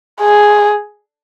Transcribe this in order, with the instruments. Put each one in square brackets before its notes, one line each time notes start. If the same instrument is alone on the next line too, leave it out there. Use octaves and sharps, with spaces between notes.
[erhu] G#4